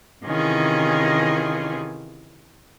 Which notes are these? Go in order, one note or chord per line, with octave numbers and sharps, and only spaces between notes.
C3 D#3 E3 C#4 F4 G#4